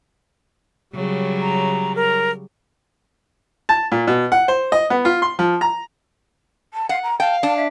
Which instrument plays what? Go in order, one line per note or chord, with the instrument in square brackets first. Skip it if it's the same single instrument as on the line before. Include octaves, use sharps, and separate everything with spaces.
[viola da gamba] C#3 F#3 G3
[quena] A#5
A#4
[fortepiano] A5
A#2
B2
F#5
C5
D#5
B3
F4
C6
F3
A#5
[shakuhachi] A5
[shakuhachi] F5 [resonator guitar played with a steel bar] F#5
[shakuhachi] A#5
[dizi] F5 [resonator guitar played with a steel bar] G5 [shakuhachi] A5
[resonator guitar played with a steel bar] D4 [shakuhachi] A5
[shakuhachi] E5